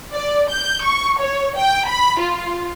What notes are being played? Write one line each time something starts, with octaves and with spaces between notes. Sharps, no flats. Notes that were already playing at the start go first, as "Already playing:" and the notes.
D5
G6
C#6
C#5
G5
B5
F4